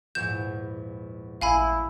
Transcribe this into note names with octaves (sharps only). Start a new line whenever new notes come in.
A#1 E2 G#2 G6 E7
A1 E4 F5 G#5 B5